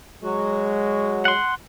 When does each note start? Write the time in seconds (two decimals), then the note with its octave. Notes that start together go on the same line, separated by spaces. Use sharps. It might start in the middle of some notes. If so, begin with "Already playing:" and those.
0.23 F#3 G#3 F#4
1.25 F#5 C6